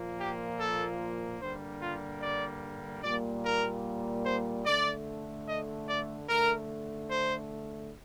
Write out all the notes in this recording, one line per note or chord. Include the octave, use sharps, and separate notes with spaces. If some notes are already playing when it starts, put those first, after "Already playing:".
Already playing: A#2 F3 A#3
G4
A4
G2 D3 G3 A#3 C5
F4
D5
A#2 G3 A#3 D5
A#4
C5
D3 A3 D5
D#5
D5
D3 A3 A#4
C5